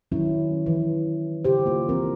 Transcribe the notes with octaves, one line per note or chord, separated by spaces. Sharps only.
D#3 F#3 C#4 E4
E3
C#3 G4 C5
A#3 F4
E3 C4 A#4